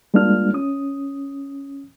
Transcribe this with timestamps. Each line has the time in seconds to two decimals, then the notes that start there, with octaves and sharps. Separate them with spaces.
0.14 G3 G#3 A#3 D4 F4 F6
0.53 C#4 D#6